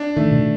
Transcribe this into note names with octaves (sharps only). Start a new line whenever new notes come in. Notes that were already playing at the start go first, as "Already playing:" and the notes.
Already playing: D4
D#3 A3
B2